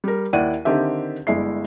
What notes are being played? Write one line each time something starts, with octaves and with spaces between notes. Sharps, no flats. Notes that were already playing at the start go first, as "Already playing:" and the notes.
G3 A#4
D#2 E4 D5 F#5 D#7
D3 D#3 C4 G4 E5
G1 G#3 E4 D5 E5 C7